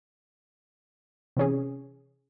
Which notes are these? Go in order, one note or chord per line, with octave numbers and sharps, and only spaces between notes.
C3 E3 C#4 G#4